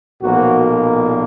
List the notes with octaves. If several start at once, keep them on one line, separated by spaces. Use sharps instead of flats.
B1 A#2 F3 A#3 F#4